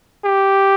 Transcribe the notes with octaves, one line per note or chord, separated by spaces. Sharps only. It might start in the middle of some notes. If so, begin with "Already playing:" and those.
G4